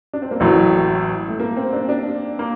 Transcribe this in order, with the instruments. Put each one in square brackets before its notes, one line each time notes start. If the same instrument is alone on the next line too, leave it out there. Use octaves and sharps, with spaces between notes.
[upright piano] D4
C4
A#3
[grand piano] A1 A2 F#3 [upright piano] A3
[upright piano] A3
A#3
C4
D4
D4
[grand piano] A#3